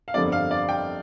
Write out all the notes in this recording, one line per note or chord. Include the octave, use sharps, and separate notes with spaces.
F5
G1 F2 D3 G3 C4 D5
F5
D5
G5